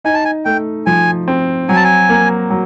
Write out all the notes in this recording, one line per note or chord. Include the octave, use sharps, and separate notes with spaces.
D#4 G#5
A5
G#5
A3 G5
F3 G#5
C4
F#3 G#5
A5
G#5
A#3
F#3